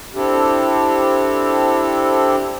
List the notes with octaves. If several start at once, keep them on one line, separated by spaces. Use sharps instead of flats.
C4 D4 E4 G4 A4